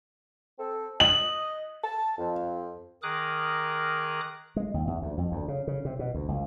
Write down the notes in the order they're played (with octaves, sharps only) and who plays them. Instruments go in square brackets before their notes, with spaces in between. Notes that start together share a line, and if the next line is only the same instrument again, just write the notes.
[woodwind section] C4 A4
[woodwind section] D#5 [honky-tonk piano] F#7
[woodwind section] A5
F2
[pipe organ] D#3 G#4 A#4 D6 D#6 F#6
[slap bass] G#3
D#2
E2
D2
F2
D2
C#3
C#3
C3
B2
D2
C#2